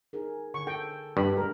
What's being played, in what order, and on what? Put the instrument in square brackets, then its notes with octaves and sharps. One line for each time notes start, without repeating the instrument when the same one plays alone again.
[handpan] D#4 G#4 A#4
[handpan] D3 [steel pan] C#6
[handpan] A4 [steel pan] G5
[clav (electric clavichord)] G2 [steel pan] B5
[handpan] G#3 D4 B4 [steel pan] A#4